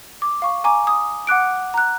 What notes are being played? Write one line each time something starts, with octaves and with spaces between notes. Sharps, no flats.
D6
F5 C#6
G#5 A#5 D6
D#6
F#5 D6 F#6 D7
A#5 F#6